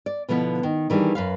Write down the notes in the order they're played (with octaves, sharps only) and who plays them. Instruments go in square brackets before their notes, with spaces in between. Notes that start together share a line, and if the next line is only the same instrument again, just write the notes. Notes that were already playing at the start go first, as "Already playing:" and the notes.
[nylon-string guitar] D5
B2 D3 F3 B3 E4
D#3
D#3 E3 G3 D4 G#4
F#2 B4 F5